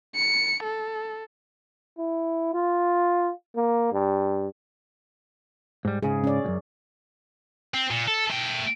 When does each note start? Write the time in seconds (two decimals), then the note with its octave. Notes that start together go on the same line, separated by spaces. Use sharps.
0.15 C#7
0.64 A4
1.98 E4
2.54 F4
3.56 A#3
3.92 G2
5.85 G#2 G3
6.03 G#2 C#3 G#4
6.24 C#4 D5
6.44 C#2 F#2
7.74 C4
7.91 A#2
8.08 A4
8.30 A3 G5